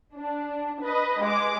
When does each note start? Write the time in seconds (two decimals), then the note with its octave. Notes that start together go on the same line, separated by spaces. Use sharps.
0.16 D4
0.82 B4 D#5
1.21 G#3 D6